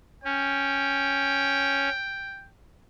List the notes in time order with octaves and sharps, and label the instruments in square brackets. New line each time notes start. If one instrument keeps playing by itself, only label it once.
[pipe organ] C#4 [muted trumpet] G5